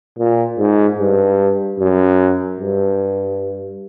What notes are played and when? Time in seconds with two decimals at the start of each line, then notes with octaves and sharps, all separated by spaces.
0.18 A#2
0.58 G#2
0.99 G2
1.80 F#2
2.60 G2